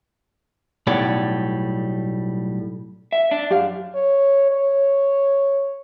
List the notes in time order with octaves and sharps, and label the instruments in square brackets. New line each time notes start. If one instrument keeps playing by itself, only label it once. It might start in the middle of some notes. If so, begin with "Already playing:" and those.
[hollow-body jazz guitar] B1 A2 G3 D5 F#5
[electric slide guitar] E5
D4
[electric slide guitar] F#2 [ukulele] G4 D5 F5
[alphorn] C#5
C#5